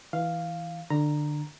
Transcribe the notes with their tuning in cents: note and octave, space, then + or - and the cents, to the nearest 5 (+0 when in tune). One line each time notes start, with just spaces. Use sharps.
E3 -10 F5 +0
D3 +20 A#5 +0